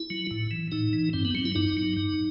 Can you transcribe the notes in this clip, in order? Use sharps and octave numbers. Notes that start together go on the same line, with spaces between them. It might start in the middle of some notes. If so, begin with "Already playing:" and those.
Already playing: E4
F#3
A2
E3
A2 D#4
E3
G2 C4
B3
F#3 C4
E4
G2 D#4
F#3
G2